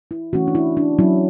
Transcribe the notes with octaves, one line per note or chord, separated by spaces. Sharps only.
E4
E3 A3 C#4 F#4
D4
E4
D4
F#3 C#4 E4